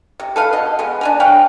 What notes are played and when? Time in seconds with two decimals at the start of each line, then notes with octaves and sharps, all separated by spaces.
0.20 C3
0.36 A4 B4 F5
0.53 B2 D#5
0.79 G#3 B3
1.01 D4 G#5 A#5
1.20 B4 C#5 F5 G5